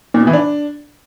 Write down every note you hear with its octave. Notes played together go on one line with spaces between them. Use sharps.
A#2
B2
E3
D4